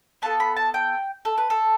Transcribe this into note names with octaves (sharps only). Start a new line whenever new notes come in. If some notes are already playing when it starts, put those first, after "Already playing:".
B3 F4 A4 A5
B5
A5
G5
A4
B4
A4